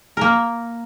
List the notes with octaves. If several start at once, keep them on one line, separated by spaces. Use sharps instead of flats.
A#3 A#4